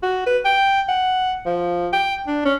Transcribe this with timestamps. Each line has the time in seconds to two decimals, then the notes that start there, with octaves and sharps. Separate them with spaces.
0.03 F#4
0.27 B4
0.45 G5
0.89 F#5
1.46 F3
1.93 G5
2.27 D4
2.45 C#4